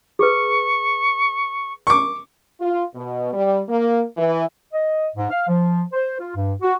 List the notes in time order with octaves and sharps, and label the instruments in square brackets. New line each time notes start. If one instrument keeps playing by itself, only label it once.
[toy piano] G#4 B4 [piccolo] C#6
[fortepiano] C#6 D6
[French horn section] F4
B2
G3
A#3
E3
[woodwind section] D#5
G#2
F5
F3
C5
F4
G2
F#4